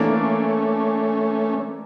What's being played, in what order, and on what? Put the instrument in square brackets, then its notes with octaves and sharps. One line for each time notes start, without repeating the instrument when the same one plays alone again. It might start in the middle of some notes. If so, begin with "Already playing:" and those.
Already playing: [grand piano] E3 A#3 D4 A4 D5 [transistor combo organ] A3 C#4